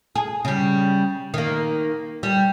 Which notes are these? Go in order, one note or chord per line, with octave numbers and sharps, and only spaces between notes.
G#4
C#3 G3
D#3 A#3
G3